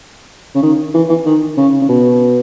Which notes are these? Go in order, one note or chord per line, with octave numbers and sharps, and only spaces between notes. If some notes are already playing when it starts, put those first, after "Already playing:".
C#3
D#3
E3
E3
D#3
C#3
C#3
B2